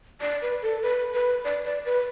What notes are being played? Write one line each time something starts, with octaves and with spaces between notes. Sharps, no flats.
D5
B4
A4
B4
B4
D5
D5
B4